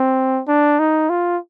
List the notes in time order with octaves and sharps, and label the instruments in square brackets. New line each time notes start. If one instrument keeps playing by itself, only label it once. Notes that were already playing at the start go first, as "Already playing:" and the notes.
Already playing: [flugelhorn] C4
D4
D#4
F4